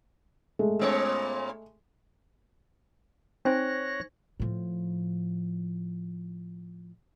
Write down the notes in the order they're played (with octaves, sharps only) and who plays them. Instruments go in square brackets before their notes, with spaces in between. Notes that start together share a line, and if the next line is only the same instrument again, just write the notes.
[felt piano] G#3 A3
[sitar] A#2 B3 C#5
[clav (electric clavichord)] C4 [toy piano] D#4 C5 G#5 [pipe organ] C#5 F#6 A#6
[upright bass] A2 F3